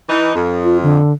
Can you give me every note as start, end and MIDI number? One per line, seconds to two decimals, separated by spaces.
0.09 0.34 52
0.09 0.34 63
0.35 0.99 41
0.64 0.78 65
0.83 1.13 50